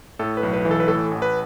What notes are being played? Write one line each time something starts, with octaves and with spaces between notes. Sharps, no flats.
A2 A4
B4
B1
B4
E3
A4
B4
A2 A4
A1
B4